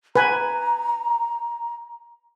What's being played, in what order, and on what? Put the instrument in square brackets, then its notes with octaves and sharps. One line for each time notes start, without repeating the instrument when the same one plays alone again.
[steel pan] B4 G#5 [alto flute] A#5